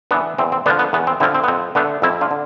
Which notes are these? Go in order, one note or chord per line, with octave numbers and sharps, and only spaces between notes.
E3 B3 D4
E2 C4
C4
D3 F3 B3 D4
B3
E2 B3
C4
D3 F3 C4 E4
C4
B3
F2 C4
D3 A3 B3 D4
F2 C4 E4
D4 F4
D3